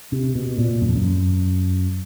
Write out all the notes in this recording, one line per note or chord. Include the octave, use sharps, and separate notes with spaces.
C3
B2
A#2
F#2
F2
F#2